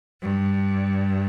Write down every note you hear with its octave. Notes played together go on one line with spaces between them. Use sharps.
G2